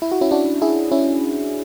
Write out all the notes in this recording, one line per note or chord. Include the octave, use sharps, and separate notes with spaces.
E4
F#4
C#4 E4
D4 F#4
E4 G#4
C#4 E4